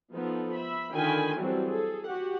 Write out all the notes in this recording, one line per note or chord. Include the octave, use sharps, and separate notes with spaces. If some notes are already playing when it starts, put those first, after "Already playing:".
F3 B3 D#4 A4
E5 B5
D3 D#3 F4 G5 G#5 B5
E3 F#3 G3 C4 F#4 A4
G#4 A4
F#4 G4 F#5